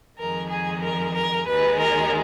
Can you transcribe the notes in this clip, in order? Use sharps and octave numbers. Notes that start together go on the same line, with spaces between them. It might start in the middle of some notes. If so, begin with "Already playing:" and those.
F2 D#3 G#3 A#4
G#4
A#4
A#4
D#2 D#3 G#3 B4
A#4